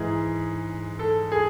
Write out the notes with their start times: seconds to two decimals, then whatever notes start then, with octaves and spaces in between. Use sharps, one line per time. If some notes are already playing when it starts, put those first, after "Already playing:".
Already playing: G#2 E3 G#4
0.99 A4
1.32 G#4